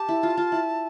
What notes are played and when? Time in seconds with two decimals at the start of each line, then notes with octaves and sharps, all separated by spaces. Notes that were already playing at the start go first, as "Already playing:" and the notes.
Already playing: G4 A5
0.09 E4
0.23 F4
0.37 F4
0.52 E4